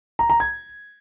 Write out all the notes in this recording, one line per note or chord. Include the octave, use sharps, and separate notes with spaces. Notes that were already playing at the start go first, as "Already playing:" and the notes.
A#5
A#5
G#6